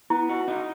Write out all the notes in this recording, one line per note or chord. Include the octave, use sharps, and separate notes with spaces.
B3 E4
F#4
D#4